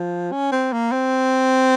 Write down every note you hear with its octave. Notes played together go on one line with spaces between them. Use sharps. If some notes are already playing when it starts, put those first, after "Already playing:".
Already playing: F3
C#4
C4
A#3
C4